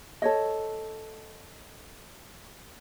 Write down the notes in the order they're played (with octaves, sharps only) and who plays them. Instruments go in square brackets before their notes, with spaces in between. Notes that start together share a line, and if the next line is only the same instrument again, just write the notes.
[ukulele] A4 C#5 D#5